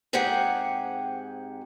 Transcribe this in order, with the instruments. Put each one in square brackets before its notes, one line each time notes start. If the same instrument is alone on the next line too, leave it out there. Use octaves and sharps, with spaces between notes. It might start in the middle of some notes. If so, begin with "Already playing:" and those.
[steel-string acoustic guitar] G#2 C4 G4 G#4 F#5 G5